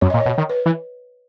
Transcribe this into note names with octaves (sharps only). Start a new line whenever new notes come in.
F#2 C#5
A#2 D#5
C#5
B2
D#3
B4
E3